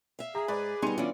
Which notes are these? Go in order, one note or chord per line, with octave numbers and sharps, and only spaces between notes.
E5 F5
G#4 A#5
G#2 B4 D5
D3 G3 B3 D#4 G#5 C6 C#7
E3 B3 C#4 D4 F4 D5